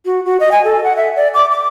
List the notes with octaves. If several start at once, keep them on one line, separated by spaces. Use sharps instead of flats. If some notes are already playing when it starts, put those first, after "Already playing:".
F#4
F#4
D#5
G#5
A4
F#5
E5
D5
D6
D6